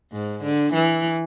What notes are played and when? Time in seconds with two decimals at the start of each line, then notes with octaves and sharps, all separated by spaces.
0.12 G#2
0.43 D3
0.74 E3